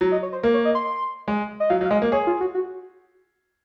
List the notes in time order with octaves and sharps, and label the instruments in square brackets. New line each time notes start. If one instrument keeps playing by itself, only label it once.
[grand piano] F#3 [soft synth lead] A#5
[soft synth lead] D#5
C#5
C5
[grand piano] A#3 [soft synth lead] A#4
[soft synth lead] C#5
D#5
C6
[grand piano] G#3
[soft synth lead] D#5
[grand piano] F#3 [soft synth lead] F5
[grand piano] F#3
[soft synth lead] F5
[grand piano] G#3 [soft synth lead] D#5
[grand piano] A#3
[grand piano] G#4 [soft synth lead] C#5
[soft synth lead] F4
F#4
F#4